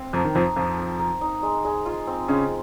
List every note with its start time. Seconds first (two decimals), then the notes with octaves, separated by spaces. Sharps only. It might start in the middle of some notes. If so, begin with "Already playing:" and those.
Already playing: C4 F5
0.13 F2 F3 A#4
0.25 D#3
0.34 F2 F3 D#4
0.56 F2 F3 F5
0.78 C4
0.99 A#4
1.21 D#4
1.43 G#3
1.65 G#3
1.86 F4
2.07 C4
2.28 C#3 G#3 C#4